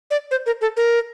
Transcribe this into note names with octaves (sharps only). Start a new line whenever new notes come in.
D5
C5
A#4
A4
A#4